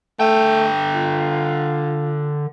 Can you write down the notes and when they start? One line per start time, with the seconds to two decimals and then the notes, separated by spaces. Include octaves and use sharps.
0.20 D3 A3 G5
0.95 F4